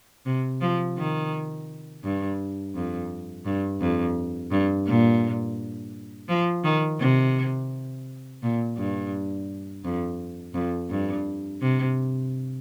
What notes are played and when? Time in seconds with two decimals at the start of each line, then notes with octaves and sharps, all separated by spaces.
0.26 C3
0.61 F3
0.98 D#3
2.04 G2
2.75 F2
3.46 G2
3.80 F2
4.52 G2
4.87 A#2
6.29 F3
6.64 D#3
7.00 C3
8.43 A#2
8.77 G2
9.84 F2
10.54 F2
10.90 G2
11.61 C3